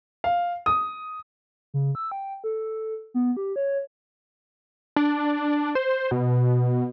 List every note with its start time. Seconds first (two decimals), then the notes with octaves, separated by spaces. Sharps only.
0.24 F5
0.66 D#6
1.74 C#3
1.95 E6
2.12 G5
2.44 A4
3.14 B3
3.37 G4
3.56 C#5
4.96 D4
5.75 C5
6.11 B2